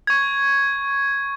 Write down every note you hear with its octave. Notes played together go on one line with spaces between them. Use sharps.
C#6 G#6